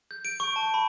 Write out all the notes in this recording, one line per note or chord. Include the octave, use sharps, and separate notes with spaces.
G6
D7
C#6
A5
B5